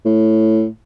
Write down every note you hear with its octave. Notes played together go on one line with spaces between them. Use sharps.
A2